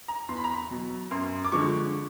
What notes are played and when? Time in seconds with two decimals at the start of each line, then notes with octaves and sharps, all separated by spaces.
0.08 A#5
0.29 E2 C6
0.37 B5
0.44 A#5
0.52 B5
0.71 B2 F#3
1.11 F#2 C6
1.45 D6
1.52 D3 F3 G#3 C#6